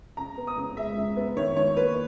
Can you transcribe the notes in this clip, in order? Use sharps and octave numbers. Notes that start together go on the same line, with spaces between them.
C#3 A#5
B3
D#6
C#3
G#3 E5
C#3
B3
D#3 C#5
D#3 C#5
A#3 B4